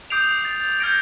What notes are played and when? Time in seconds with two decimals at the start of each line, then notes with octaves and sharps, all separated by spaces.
0.10 D6 D#6 G6 C7 D7 F7
0.45 A6
0.80 F6 G6 G#6 A#6 C#7 D7